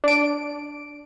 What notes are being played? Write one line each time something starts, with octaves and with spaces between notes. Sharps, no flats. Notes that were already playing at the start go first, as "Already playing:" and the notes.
D4 D7